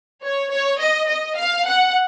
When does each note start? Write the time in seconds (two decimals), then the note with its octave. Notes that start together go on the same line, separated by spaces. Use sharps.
0.23 C#5
0.51 C#5
0.80 D#5
1.09 D#5
1.38 F5
1.67 F#5